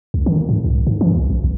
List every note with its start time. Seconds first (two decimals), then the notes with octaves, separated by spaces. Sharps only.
0.14 C#2
0.26 D#3
0.49 G#2
0.64 C2
0.87 G#2
1.01 E3
1.15 C2
1.30 A#1
1.44 A#1